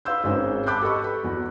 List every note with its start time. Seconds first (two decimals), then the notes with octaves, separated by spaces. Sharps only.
0.05 B4 F5 C6 E6 G6
0.24 G#1 G#2 G#3 C#4 G#4 C5
0.66 G5 A5 B5 D6 F#6 G6
0.81 G4 A4 B4 D#5 C#6
1.04 B5
1.24 E2 F#4